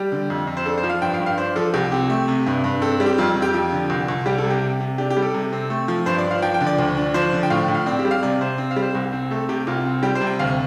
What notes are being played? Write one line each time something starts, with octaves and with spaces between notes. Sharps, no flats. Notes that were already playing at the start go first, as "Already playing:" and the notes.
Already playing: G3 G4
D3
F2
F2
C5
D4 A4
C5
F3
F5
G2 G5
F5
G2
F5
D4 C5
F3 A4
C2 G4
C4 G4
A3
C3
G2
G2
C4 A4
G3
G4
F2 F4
F2
G4
F3
D3
C2
C2
G3 G4
A4
C3
G4
C3
C3
D4 G4
G4
G3
A4
C3
C4
A3
F3
G2 C5
D5
D4
F5
F3 G5
G5
D3
D5
D2
D4
F3 C5
D3
G5
A2 F5
A2
F5
C4 D5
G4
G3
F5
C3 D5
C3 C5
C4
F5
G3
C5
C2
C4
A3 A4
C3 G4
C2 F4
C4
G3 G4
C5
C3
G5
D2 F5